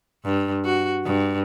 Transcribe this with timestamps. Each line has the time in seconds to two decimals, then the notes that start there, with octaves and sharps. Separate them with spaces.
0.25 G2
0.65 F#4
1.05 G2